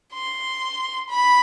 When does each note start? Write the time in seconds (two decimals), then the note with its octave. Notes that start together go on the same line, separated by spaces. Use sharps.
0.13 C6
1.09 B5